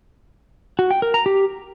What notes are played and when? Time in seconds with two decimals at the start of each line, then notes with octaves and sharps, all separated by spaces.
0.79 F#4
0.91 G5
1.02 A#4
1.14 A#5
1.26 G4